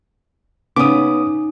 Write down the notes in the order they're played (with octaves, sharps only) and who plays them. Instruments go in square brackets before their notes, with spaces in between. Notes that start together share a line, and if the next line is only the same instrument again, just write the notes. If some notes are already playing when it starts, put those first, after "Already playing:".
[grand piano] C#3 [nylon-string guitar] B3 C#4 [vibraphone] D#4 [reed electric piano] D6 D#6